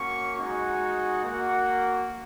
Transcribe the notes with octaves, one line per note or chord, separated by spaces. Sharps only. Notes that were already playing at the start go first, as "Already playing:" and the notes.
Already playing: A#3 C#4 F#4 C#6
G#3 D#4 F#4
A#3 F#4